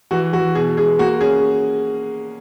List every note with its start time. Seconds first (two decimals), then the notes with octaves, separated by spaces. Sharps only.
0.11 E3 F#4
0.33 E3 F#4
0.55 B2 G#4
0.77 G#3 G#4
0.99 A#3 F#4
1.21 C#4 G#4